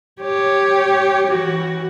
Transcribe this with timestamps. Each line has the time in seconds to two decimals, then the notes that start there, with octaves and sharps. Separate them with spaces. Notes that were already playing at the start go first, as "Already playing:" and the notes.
0.21 G4 C#5
1.28 E3 F#4